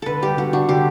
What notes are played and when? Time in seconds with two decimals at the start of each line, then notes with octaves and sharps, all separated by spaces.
0.02 D3 A4 B4
0.22 G3 G4
0.37 D3 F#4
0.53 D4 F#4
0.68 D3 G4